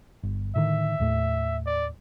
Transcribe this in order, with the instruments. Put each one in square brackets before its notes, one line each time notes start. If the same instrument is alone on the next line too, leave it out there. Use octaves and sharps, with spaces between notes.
[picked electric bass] G1
[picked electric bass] A2 D3 D#3 [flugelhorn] E5
[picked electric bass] D#2 A2 A3
[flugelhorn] D5